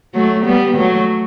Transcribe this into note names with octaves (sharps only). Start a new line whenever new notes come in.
F#3 A3
G3 B3
F#3 A3